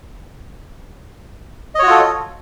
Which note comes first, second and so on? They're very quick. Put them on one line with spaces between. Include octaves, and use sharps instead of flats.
D#5 C#5 F#4 F4 A4